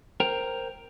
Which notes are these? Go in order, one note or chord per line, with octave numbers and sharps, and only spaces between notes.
A#4 C5 G5 A#5